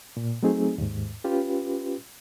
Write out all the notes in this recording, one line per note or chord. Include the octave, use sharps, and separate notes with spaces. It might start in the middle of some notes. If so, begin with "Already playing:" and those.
A#2
F#3 A3 C4 D#4 G#4
D#2 G#2
C#4 F4 G4 B4